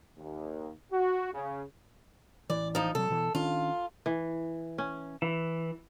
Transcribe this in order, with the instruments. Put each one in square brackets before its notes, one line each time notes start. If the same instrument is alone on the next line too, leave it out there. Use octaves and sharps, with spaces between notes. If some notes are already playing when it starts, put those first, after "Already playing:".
[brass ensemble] D#2
F#4
C#3
[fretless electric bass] A1 E3 [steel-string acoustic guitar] D5
[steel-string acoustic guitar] F3 D#4
[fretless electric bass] C3 F#3 [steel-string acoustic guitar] A4
[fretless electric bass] B2 E3
[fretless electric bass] D#3 C#4 D4 [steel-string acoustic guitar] F4
[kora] E3
C#4
[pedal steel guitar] E3